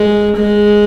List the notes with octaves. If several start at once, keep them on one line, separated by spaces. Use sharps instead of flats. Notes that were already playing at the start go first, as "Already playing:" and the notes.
Already playing: G#3
G#3